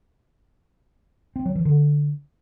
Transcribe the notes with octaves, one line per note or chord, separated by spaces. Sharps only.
C4
F#3
E3
D3